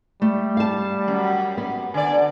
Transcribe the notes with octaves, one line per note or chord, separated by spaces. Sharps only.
G3 A3
F5 A5
F#2
B3
D3 D5 G#5